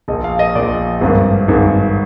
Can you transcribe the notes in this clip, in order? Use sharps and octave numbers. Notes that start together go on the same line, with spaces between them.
A#1 A#2 D#5
F5
D#5
A#1 A#2 D5
G#1 G2 D#3
G#1 G2 D#3